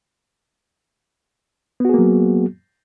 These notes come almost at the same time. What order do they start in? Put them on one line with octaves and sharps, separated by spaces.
B3 F#4 G#4 A#3 F#3